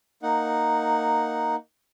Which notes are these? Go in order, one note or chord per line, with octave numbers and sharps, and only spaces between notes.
A#3 D#4 F#5